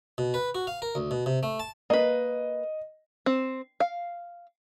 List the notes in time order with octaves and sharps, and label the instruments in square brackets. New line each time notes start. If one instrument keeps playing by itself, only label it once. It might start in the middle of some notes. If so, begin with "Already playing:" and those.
[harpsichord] B2
B4
F#4
F5
A#4
D2
B2
C3
A3
A5
[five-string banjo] A#3 B4 [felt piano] D#5
[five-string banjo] C4
F5